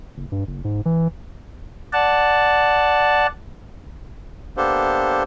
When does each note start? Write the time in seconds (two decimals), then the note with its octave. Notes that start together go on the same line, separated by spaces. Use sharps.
0.17 F#1
0.32 G2
0.47 F#1
0.64 G#2
0.85 E3
1.93 D5 F#5 A5
4.57 A#3 B3 D4 G4 A4 C5